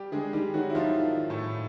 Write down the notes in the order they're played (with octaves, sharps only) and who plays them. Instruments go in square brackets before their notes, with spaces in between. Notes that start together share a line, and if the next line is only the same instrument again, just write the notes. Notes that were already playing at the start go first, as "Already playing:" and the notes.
Already playing: [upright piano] G3 G4
[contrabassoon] D3 [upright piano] G#3 G#4
[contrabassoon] D#3 [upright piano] G3 G4
[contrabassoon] D#3 [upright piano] F#3 F#4
[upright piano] E4
[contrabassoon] D#3 [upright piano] F3 F4
[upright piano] A2 A3